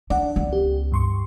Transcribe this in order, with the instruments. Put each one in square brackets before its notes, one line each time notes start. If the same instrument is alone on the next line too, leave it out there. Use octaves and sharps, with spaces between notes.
[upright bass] D4 [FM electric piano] D5 F#5
[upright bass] C#2 B3
[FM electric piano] G4
G2 C6 C#6